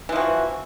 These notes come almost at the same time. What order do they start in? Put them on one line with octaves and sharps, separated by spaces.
E3 F3 F#4